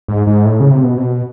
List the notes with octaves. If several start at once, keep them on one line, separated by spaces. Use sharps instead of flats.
G#2
G#2
A2
C#3
C3
B2
C3
B2